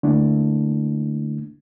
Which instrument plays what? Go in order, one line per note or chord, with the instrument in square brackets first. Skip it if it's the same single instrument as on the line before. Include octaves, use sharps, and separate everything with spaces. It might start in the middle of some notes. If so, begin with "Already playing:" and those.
[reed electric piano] D3 A3 A#3 D4 E4